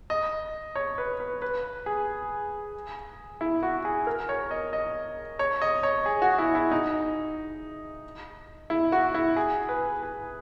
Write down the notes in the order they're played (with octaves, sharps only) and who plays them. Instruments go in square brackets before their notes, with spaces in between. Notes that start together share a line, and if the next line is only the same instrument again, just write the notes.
[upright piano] D#5
C#5
B4
B4
B4
G#4
E4
F#4
G#4
A#4
C#5
D#5
D#5
C#5
D#5
C#5
G#4
F#4
E4
E4
D#4
E4
F#4
E4
G#4
B4
G#4